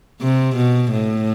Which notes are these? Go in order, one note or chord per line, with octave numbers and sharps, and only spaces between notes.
C3
B2
A2